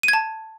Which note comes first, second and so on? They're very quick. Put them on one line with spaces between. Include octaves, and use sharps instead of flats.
D#7 G#6 A5